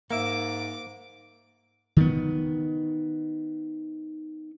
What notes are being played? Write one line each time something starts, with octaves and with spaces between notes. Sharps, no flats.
G#2 A#3 E5 D6
D#3 B3